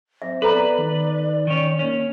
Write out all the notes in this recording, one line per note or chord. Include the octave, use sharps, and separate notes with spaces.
C4 E5
B3 A4 B4 D5 A#5 B5
D#3
D#3 C#4
A#3 C#4